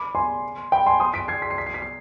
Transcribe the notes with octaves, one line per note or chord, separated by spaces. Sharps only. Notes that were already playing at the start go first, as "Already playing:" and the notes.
Already playing: B5 D6
G#5 C6
G5 B5
G#5 C6
C6 D#6
B6 D7
G#6 C7
B6
C7
B6
C7
B6
C7